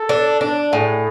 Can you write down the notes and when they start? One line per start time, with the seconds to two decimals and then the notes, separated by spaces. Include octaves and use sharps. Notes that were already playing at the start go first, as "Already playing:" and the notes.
Already playing: A4
0.09 D4
0.41 D4
0.72 A2 G#4